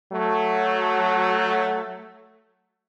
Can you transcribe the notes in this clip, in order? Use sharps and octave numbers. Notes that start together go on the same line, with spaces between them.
F#3 A3